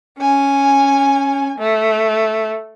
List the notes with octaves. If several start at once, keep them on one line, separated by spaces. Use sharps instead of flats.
C#4 G#5
A3